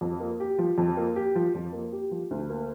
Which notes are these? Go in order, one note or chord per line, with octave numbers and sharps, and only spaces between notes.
F2
A#3
G4
F3
F2
A#3
G4
F3
F2
A#3
G4
F3
D2
A#3